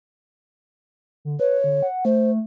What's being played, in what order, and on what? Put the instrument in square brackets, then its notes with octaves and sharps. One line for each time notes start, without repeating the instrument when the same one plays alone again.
[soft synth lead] D3
[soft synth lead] B4 [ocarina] C#5
[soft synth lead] D3
F#5
[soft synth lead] A3 [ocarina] C5